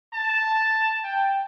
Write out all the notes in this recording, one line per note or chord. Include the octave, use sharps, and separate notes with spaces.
A5
G5